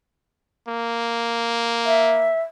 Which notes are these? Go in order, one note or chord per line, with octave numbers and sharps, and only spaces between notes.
A#3
E5